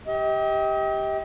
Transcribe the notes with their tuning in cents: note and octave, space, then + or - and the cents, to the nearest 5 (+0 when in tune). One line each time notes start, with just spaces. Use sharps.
G4 +0 D#5 +40